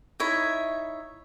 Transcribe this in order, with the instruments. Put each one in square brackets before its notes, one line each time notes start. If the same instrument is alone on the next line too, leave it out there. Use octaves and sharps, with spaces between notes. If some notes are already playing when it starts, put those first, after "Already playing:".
[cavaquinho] D#4 E4 C#5 E5